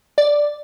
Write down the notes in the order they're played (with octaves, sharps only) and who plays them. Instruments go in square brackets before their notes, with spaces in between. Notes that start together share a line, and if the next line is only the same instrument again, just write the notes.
[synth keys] D5